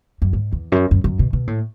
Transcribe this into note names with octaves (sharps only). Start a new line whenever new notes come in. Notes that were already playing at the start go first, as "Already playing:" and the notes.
F#2
G#2
E2
F#2
F#2
F#2
B2
B2
A2